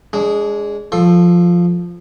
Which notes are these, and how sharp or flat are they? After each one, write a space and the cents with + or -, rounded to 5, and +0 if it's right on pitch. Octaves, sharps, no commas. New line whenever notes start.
G#3 +0 D4 -30
F3 +0 A4 +0 C6 +30